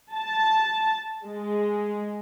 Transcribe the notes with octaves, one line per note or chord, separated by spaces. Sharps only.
A5
G#3